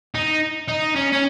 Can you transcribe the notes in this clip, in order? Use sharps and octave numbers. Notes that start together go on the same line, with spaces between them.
D#4
D#4
C#4
C#4